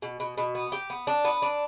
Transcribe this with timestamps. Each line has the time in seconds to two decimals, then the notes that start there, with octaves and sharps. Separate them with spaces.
0.02 B2
0.20 B2
0.38 B2
0.55 B3
0.72 G4
0.90 B3
1.07 D4
1.25 B3
1.42 D4